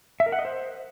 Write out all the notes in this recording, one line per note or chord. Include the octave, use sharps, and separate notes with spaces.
E5
A#4
F#5
D#5
C5